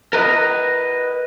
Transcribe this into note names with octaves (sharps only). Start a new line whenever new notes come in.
A#4 B4 D#5